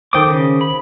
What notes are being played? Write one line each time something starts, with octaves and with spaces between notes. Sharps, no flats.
D#3 A4 C5 G5 D6 D#6
C#3
B5